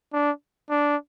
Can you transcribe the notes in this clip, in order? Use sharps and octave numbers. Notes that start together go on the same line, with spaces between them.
D4
D4